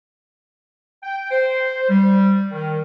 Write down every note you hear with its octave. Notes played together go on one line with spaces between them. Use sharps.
G5
C5
G3
D#3